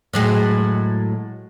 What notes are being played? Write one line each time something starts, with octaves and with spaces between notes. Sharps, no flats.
A2 F#3 G#3